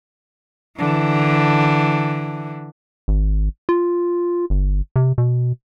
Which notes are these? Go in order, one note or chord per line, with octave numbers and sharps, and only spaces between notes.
D3 E3
G#1
F4
G1
C3
B2